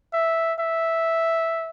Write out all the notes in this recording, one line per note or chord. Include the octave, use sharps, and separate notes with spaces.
E5
E5